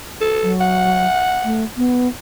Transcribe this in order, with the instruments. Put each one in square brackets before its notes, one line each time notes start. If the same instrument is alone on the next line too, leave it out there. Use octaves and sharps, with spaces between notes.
[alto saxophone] A4
[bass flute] F#3
[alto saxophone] F#5
[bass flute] A3
B3